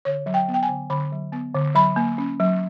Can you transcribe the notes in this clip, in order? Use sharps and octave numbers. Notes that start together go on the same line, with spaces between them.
D3 C#5
F#3
G5
B3
G5
G#5
D3
D3 B5
F#3
B3
D3
F#3 B5
A#3
C#4
F#3